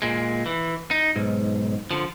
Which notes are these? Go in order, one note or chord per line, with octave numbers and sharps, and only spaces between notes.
A#2 G#3
E3
D#4
B1 G#2
D3 F3